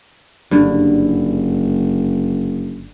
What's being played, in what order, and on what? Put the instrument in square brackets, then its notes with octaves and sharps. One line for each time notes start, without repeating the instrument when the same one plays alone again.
[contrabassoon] F#1 [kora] G2 D3